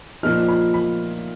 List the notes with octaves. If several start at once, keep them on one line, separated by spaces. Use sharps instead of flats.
A#2 F3 A#3 D#4 F6
B5
B5